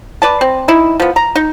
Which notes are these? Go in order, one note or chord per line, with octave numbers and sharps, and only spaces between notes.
B4 D5 A5
C4
D#4 E4
F3 B3
A#5
D#4